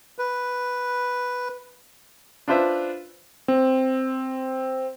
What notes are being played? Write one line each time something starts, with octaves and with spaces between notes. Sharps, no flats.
B4
D4 F4 B4 C5 E5
C4